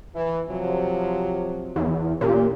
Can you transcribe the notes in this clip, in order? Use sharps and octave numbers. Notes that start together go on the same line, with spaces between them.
E3
C3 F3 F#3
E2
A#2 C#4 G4